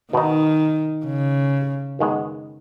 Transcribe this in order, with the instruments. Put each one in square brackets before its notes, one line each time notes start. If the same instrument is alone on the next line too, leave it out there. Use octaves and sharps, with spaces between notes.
[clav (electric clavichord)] B2 B3 D#4 [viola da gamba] D#3
[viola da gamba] C#3
[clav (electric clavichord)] F#2 D#3 G#3 B3